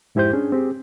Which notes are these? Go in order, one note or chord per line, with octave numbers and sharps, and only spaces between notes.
F2 G#2 E4 G4 C5 G6
C#4 D4 G#4
C4 G4 G#4